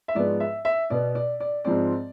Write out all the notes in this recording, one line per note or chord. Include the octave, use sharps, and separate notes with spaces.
E5
G#2 F3 G#3 B3 D5
E5
E5
B2 B3 D5
D5
D5
G#2 F3 G#3 C4 D5